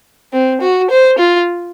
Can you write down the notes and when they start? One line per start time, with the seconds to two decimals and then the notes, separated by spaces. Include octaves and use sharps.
0.33 C4
0.61 F#4
0.90 C5
1.18 F4